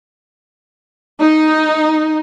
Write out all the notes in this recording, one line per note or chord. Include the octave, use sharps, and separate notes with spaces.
D#4